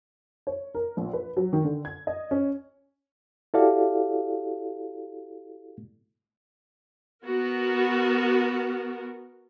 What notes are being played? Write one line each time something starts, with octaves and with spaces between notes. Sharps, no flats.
C#5
A#4
A#1
B4
F#3
D#3
D3
G#6
D#5
C#4
E4 F#4 G4 A4 D5 F5
B3 F#4 A#4